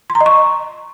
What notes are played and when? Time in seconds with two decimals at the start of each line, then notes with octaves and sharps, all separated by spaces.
0.10 C6
0.15 A#5
0.21 D#5
0.26 C#6